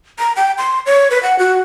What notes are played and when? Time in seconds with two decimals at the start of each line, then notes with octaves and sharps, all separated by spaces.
0.19 A#5
0.36 G5
0.58 C6
0.86 C#5
1.11 B4
1.23 F#5
1.39 F#4